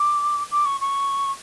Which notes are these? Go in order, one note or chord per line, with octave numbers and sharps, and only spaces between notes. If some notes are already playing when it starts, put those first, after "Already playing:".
Already playing: D6
D6
C#6
C#6